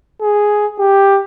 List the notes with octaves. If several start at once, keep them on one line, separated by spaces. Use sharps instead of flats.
G#4
G4